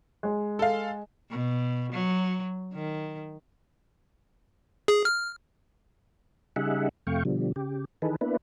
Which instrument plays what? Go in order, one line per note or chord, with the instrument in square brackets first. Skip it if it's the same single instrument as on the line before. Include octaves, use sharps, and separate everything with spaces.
[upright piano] G#3
[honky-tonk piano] A4 F5
[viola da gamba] B2
F#3
D#3
[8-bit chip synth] G#4
F6
[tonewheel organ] C#3 G3 D#4 G#4 E5 F#5
F2 C3 A3 F5 G5 C#6
B2 D3 F3 G3
C#3 G4
D#3 E3 D#4 G#4 A4 B4
A#3 B3 D4 E4 B4